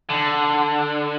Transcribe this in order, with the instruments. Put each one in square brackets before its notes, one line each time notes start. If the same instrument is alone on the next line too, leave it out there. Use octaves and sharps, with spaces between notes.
[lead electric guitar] D3